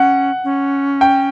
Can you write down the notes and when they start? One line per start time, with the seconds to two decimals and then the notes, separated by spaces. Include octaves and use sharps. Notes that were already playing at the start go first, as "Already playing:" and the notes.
Already playing: C#4 F#5
0.44 C#4
1.01 G5